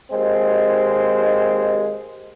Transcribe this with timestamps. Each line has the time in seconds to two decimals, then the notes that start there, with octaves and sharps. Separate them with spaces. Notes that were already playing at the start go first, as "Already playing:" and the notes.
0.11 D#2 G#3 C4